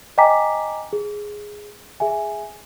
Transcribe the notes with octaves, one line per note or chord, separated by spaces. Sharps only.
D#5 G5 G#5 A#5 D6 B6
G#4
G#4 E5 G#5